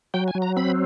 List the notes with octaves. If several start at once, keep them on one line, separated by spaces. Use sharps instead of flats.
F#3 G5
G#5
F#3
A#5
C4 B5